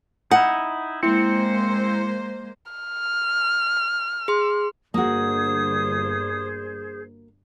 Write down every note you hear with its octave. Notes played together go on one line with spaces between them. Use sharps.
D#4 E4 F#5
G#3 A#3 C4 E4 C5 C#7
F6
G#4 C6
G1 D3 A#3 F#4 G#4 C5 D#6